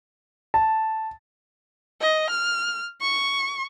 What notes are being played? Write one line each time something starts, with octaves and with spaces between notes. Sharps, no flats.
A5
D#5
F6
C#6